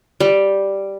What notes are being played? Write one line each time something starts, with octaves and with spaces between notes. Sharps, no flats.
G3